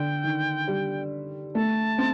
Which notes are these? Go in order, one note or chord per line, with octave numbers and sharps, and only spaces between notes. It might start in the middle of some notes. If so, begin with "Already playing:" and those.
Already playing: D3 G5
D#3
G3
A3 A5
C4